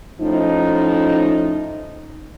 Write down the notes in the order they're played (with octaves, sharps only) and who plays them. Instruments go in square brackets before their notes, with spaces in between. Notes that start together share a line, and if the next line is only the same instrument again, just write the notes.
[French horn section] A2 F3 C#4 D#4